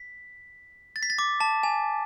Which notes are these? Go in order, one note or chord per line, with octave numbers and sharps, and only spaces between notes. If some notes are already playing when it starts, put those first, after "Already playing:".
Already playing: B6
A6
B6
A6
D6
A5
G#5